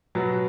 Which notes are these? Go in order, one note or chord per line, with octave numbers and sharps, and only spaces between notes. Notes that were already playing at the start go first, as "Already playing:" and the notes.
B2 F#3 B3 F#4